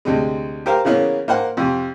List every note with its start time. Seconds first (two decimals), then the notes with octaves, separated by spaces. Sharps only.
0.05 D2 C3 G#3
0.66 G4 A#4 C5 F5
0.85 C#3 E3 A#3 B3 C#4
1.28 A#3 C5 F#5
1.57 F2 C3